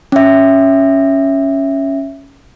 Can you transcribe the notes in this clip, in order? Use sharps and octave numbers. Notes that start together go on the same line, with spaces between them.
C#4 E5